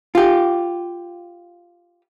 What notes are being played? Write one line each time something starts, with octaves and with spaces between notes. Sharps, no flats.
F4 G4